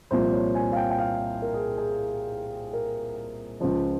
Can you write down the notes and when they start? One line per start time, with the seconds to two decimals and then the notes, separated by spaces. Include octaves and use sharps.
0.11 C2 A#2 F3 C5
0.33 C#5
0.55 G#5
0.72 F5
0.77 G5
0.91 G5
0.98 F5
1.42 A#4
1.54 G#4
1.77 G#4
2.73 A#4
3.60 C#2 C#3 F3 C5